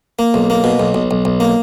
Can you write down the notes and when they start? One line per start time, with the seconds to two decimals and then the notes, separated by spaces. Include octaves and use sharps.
0.19 A#3
0.34 B1
0.50 A#3
0.64 B2
0.80 B1
0.94 B1
1.11 B1
1.25 B1
1.40 A#3